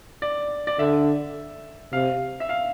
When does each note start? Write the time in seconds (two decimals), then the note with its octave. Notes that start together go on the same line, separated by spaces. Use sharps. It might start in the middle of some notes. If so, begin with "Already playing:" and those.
0.22 D5
0.67 D5
0.79 D3 E5
1.92 C3 F5
2.40 E5
2.49 F5